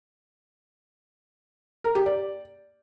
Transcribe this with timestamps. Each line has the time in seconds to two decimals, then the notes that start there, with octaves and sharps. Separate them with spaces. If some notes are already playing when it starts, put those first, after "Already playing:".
1.84 A#4
1.95 G4
2.06 D5